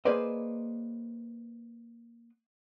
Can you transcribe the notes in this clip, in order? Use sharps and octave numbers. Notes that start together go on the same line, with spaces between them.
A#3 G#4 B4 C5 D5 D#5